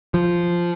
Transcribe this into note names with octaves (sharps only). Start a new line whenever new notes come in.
F3